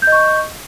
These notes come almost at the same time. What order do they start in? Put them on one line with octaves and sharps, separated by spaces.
G6 D#5 C#6